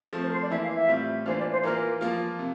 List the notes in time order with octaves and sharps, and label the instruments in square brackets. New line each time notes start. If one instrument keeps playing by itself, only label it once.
[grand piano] F3 A3 C4
[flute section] C5
A#4
C5
D5
[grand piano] E3 A#3 E4 [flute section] E5
[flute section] F5
E5
[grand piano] A2 G3 C4 F4
[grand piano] E3 A#3 D4 F4 [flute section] C5
[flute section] D5
C5
[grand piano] E3 A#3 F4 [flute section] A#4
[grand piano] F3 A#3 F4
C3